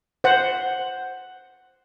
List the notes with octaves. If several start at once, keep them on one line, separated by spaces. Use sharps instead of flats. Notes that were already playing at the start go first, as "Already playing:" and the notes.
C5 F#5